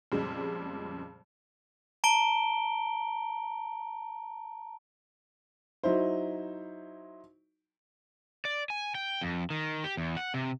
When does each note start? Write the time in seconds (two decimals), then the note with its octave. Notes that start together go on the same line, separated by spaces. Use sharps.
0.12 F2 A#2 C#3 G3 G#3
2.04 A5 A#5 D7 G7
5.84 F#3 D#4 E4 C5
8.45 D5
8.70 G#5
8.95 G5
9.21 F2
9.50 D#3
9.84 G4
9.97 E2
10.17 F#5
10.34 C3